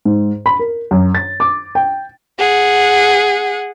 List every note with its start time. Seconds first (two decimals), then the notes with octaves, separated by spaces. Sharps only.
0.05 G#2
0.46 B5
0.59 A#4
0.91 F#2
1.15 A6
1.40 D6
1.75 G5
2.39 G#4 F#5